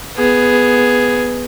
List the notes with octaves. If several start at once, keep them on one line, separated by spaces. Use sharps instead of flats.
B3 G#4